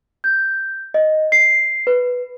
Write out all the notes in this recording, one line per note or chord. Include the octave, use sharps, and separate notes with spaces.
G6
D#5
C7
B4